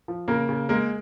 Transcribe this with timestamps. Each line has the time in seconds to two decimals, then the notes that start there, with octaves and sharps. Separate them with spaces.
0.08 F3
0.28 C#3 A#3 A#4
0.49 C#3
0.69 G#3 A#3 A#4